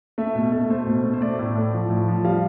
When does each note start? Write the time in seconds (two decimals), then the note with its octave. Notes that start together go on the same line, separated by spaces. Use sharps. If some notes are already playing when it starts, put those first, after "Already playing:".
0.18 A3 E5
0.35 B2
0.52 A3
0.70 A3 C5
0.86 B2
1.04 A3
1.13 C5
1.21 A3 D5
1.39 A2
1.55 A2
1.73 F3
1.90 A2
2.08 F3
2.25 G3 F5